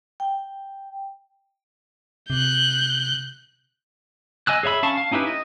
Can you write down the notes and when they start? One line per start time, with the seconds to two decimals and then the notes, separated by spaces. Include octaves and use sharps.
0.20 G5
2.30 C3 F#6 G6
4.47 D#5 G#5 E6 F#6
4.63 G#4 C#5 E5 B5 E6
4.83 C#4 F5 A5 C#6
4.97 F5
5.11 C#4 D#4 E4 G4 B4
5.27 D#5